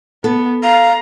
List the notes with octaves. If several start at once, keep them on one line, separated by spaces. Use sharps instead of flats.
B3 A4
F5 A#5